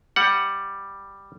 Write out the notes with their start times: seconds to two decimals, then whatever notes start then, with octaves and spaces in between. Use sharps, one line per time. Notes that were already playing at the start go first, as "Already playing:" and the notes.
0.16 G3 F#5